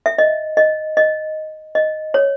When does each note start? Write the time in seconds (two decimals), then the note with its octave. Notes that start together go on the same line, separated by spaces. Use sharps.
0.06 E5
0.18 D#5
0.57 D#5
0.97 D#5
1.75 D#5
2.14 C#5